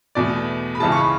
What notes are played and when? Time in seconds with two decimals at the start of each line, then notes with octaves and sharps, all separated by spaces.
0.15 E2 B2 A3 D5
0.75 B5
0.80 C#2 C#3 E3 G#3 A5
0.92 C#6
0.97 B5